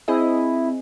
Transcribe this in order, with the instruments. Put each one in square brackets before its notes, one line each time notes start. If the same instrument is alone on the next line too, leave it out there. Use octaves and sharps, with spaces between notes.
[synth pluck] C4 G#4 D#5 [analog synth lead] E4